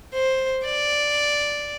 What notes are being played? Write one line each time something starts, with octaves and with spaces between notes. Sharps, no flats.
C5
D5